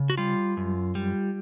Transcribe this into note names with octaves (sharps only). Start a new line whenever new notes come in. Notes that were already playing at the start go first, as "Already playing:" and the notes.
Already playing: C#3
F#4
G3 F4
F#2
G3